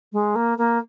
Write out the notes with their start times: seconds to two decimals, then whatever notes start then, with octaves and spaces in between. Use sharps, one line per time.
0.13 G#3
0.35 A#3
0.58 A#3